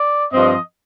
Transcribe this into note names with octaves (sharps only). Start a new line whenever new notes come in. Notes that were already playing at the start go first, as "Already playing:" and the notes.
Already playing: D5
G2 F3 C4 D#5